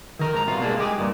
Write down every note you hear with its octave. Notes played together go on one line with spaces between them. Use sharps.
D#3 A#4
G#2 A#5
C2 B2 F4
G#3 A#3 D4
G#3 G4 G#4
G2 A#2